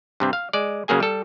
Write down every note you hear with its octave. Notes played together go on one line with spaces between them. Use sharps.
G2 C3 C4
F5
G#3 D5
C#3 F#3 A#3 G#4 G#5
G3 A4